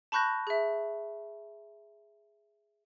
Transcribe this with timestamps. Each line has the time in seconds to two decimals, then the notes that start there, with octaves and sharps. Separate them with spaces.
0.12 A5 B5 C#6 F#6 G6 A#6
0.47 G#4 E5